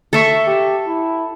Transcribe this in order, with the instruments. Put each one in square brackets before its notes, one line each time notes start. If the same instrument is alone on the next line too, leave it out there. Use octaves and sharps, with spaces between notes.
[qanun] A4 E5 C#6
[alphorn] G4
E4